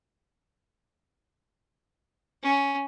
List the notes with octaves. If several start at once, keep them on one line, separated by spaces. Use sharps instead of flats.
C#4